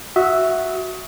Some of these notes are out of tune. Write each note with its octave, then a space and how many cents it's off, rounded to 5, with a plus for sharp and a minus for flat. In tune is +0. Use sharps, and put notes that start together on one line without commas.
F#4 +0 E5 +0 D#6 +35